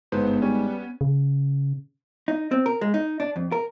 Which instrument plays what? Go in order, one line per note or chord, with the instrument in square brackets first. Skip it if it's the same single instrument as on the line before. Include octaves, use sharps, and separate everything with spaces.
[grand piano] G1 B4 C5 [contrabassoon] G#2 [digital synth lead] B3
[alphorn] G3 [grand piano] C#4
[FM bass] C#3
[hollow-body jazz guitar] D#4
C4
A#4
G#3
D#4
D4
F2
A#4